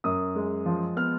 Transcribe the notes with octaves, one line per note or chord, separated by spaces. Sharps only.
F#2 D#6
G#3
F3
B3 F6